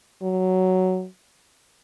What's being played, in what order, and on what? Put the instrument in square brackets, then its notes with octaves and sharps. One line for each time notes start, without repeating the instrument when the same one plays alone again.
[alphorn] F#3